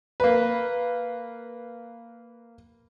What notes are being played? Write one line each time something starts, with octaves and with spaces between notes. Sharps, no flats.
A#3 B4